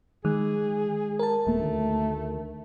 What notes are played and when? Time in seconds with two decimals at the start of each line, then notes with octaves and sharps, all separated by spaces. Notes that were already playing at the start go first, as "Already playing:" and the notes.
0.25 D#3 G#3 G#4
1.19 A#4 A5
1.47 D#1 A3 A#3
1.60 D2 D#3